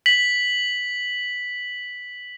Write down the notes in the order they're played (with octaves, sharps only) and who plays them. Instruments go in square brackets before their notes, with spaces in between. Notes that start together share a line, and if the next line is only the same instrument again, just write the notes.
[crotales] B6 F#7